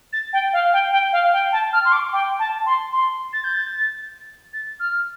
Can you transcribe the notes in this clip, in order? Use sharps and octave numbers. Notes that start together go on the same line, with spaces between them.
A6
G5
F5
G5
G5
F5
G5
A5
F6
C6
D6
G5
A5
C6
C6
A6
G6
A6
A6
F6